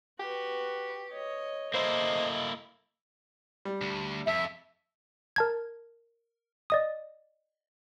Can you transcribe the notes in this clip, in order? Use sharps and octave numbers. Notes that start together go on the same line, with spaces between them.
F#4 G4 B4
C#5 D#5
A#3 E4 A4 C5 D#5
G3
D2
F2 E5
A#4 A5 G#6
D5 D#5 D#6